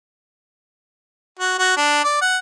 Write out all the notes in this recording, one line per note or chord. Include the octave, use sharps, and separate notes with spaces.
F#4
F#4
D4
D5
F#5